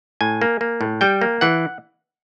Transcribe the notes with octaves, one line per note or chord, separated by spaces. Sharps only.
A2 G#5
A#3
A#3
A2
G3 G5
A#3
E3 F#5